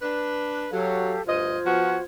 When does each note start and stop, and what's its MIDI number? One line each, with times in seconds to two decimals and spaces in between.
0.02 0.66 62
0.02 0.66 71
0.71 1.14 54
0.71 1.22 67
0.71 1.22 69
0.71 1.22 77
1.26 1.57 38
1.26 1.57 43
1.26 2.04 65
1.26 2.04 72
1.26 1.57 75
1.26 2.04 92
1.65 1.95 53
1.65 1.95 59
1.65 1.95 66